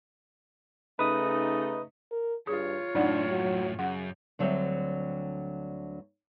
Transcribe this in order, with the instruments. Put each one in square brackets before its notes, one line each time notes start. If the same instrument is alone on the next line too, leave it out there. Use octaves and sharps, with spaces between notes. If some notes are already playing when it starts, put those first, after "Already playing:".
[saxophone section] C#3 A3 D#4 [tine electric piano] B4 D#6
[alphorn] A#4
[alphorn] G2 [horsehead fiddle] F4 C#5 [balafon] G#4
[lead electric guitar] F#2 A2 [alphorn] D4 [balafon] D#4 D5 F#5
[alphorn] F#3
[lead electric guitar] F#2 [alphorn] C#3 [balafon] F#5
[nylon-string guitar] D2 D3 F#3 G3 C4 E5